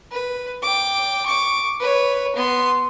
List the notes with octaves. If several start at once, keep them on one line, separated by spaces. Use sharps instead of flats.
B4
G5 D6
C#6 D6
B4 C#5
B3 C6